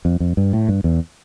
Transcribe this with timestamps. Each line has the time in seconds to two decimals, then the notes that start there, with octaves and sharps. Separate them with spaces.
0.05 F2
0.20 F2
0.37 G2
0.53 A2
0.69 G2
0.84 E2